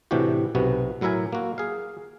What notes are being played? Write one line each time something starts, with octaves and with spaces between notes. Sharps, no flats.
A2 C3 E3 D4 F#4 G4
B1 C3 B3 F#4
A2 F#3 E4 A#4 E5 G#5
A#3 F#4
G#4 F5